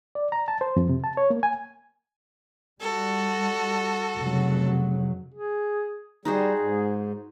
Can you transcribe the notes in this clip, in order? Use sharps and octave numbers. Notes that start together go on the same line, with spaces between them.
D5
A#5
A5
C5
F2
C3
A5
C#5
A#3
G#5
G3 F#4 A4
F1 C#3 F#3
G#4
G3 D#4 F#4 G#4 C5
G#2